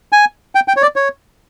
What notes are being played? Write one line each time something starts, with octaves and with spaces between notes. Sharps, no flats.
G#5
G5
G5
C#5
D5
C#5